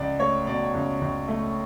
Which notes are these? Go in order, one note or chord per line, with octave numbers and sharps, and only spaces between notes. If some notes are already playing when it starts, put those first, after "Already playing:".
Already playing: C#2 D5
A3 C#5
B2 D5
C#2
C#2
A3